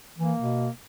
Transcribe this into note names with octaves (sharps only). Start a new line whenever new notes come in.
E3 A#3
B2